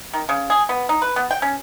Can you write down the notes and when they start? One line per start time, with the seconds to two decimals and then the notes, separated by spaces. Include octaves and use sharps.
0.14 D#3
0.29 C#3
0.50 G#4
0.69 B3
0.89 D#4
1.02 B4
1.16 B3
1.31 G5
1.42 C#4